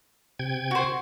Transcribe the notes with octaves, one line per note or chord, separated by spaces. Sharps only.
C3 G5 G#6
F#4 C5